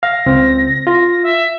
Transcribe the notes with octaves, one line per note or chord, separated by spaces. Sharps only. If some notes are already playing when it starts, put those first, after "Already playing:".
F5 A#6
C#2 C4
F4 A#6
E5